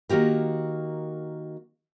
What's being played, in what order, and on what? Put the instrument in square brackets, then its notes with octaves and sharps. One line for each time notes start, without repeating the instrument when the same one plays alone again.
[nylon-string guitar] D#3 A#3 F#4 G4 A#4